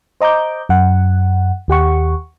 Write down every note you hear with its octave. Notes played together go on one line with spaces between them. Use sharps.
C5 D#5 A#5 D6 G6
F#2 F#5
D#2 G4 F#5 C#6